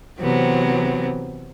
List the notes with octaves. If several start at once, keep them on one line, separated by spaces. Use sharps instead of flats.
C3 E3 F#3 B3 C4